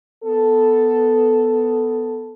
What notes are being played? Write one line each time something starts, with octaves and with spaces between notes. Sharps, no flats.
B3 A4